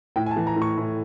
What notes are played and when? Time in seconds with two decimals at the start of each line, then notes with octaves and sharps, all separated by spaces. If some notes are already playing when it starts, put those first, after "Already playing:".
0.16 A2 G5
0.26 G#5
0.31 A5
0.36 E3
0.47 A#5
0.56 A2
0.62 C#6
0.78 A2